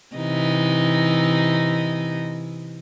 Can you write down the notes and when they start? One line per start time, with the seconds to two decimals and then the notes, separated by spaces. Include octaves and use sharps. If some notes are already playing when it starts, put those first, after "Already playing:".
0.16 C3 E3 D#4